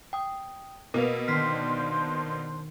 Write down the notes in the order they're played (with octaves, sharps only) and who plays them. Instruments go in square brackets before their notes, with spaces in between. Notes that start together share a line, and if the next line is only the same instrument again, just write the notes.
[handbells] G5 D#6
[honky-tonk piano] B2 A#3 [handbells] A#4 B4
[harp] D#3 [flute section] D4 C5 C6 [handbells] F6 B6 C7